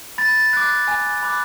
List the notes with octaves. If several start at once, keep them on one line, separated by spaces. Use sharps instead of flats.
B5 A6
D6 F#6
G#5
B5 D6 F#6